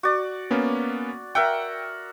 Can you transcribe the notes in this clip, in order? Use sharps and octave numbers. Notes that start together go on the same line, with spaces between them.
F#4 D5
A#3 B3 C#4
A#4 E5 F#5 G5